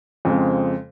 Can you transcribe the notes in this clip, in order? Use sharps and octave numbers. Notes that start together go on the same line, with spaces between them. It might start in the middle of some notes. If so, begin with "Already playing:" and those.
F2 C#3 G#3 C4